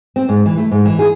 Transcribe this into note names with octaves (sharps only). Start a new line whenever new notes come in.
C4
G#2
E3
A3
G#2
E3
G#4